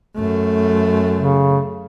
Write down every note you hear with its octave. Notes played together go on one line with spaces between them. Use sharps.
F#2 A3
C#3